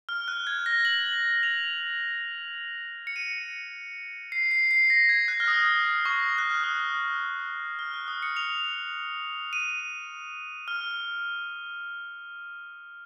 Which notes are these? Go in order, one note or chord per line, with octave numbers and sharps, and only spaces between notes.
F6
F#6
G#6
A#6
F#7
F7
C#7
D#7
C7
C7
C7
A#6
G#6
F#6
F6
D#6
C#6
F#6
F6
D#6
F6
F#6
D#6
C#7
F7
D#7
F6